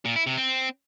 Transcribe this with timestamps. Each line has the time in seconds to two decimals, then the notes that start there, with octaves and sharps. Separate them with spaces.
0.05 A#2
0.16 E4
0.27 C3
0.37 C4